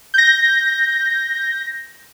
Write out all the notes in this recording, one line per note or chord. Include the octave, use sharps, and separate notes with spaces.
G6 A#6